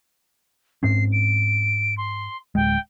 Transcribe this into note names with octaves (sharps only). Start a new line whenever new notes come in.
G#2 C4 C#4 C7
D7
C6
D1 G#3 G5